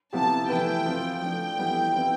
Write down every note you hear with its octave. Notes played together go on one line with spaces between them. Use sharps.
C3 F3 B3 E4 G4 A5
E3 A3 E4 B4 G5
F3 C4 F4 C5
F3 A3 D4 G5
E3 G3 B3 E4 A4
F3 C4 E4 B4